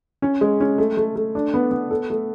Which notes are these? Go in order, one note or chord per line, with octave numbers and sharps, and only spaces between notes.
C#4
G#3
C#4
A3
A3
A3
D4
B3
B3
A4
A3